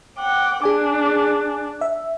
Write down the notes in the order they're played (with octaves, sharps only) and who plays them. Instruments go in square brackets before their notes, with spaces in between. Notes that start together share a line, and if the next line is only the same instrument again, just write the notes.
[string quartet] F#5 G5 D6
[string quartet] D4 [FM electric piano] G#4 G#5 D6
[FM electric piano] E5